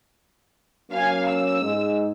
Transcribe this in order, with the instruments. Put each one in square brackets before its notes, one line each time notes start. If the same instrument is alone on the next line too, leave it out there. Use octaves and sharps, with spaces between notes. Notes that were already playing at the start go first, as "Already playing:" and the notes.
[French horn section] F#3 A#3 C#4 [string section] F5 G#5
[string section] E6
[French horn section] G#2 G#3